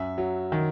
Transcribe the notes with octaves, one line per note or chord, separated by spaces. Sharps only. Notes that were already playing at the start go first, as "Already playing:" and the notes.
Already playing: F#2 E5
F#3
D#3